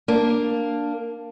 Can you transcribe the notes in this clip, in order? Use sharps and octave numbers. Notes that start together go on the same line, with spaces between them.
A#3 D4